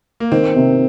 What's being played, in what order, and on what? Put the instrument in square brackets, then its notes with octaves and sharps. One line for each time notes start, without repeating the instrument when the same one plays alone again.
[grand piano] A#3
[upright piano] D#3 [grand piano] C4
[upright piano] C3